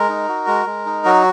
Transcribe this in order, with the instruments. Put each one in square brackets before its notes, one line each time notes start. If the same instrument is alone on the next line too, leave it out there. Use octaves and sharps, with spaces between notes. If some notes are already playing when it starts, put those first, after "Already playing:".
Already playing: [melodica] G#3 A#4
D#4
F#4
G#3
G#3
D#4
F#3 F#4